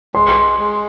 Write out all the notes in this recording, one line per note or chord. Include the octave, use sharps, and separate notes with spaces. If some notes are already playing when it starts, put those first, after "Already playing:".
G#3 C6
G#3